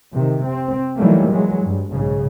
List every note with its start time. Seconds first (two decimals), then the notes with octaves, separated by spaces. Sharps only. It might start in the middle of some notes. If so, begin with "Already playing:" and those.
0.14 C3 D#3
0.47 C4
0.97 D#3 E3 F#3 G3 A3 A#3
1.31 E3 F#3 G#3
1.63 G2
1.93 B1 G#2 C#3